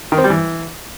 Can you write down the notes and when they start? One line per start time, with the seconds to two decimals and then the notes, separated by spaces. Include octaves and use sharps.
0.12 D#3
0.18 C4
0.24 G3
0.30 E3